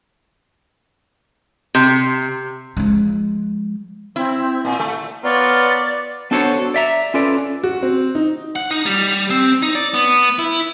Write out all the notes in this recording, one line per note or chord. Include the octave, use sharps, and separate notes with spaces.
C3
F3 G#3
C4 E4
A#2
A3
B3 F4 A#4 C#5 D5
B3 D4 F#4 A4 C5 C#5
D5 E5 A#5
C#4 F4 A4 B4 D5
F#4
C4
D#4
F#5
D#4
G3
C4
D#4
D5
B3
E4